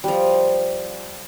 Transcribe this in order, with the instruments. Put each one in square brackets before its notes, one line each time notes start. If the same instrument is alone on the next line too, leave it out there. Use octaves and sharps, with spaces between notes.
[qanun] F3 G3